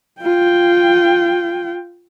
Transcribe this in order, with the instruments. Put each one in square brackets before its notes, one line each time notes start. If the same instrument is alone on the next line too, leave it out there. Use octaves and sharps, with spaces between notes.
[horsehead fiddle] F4 G5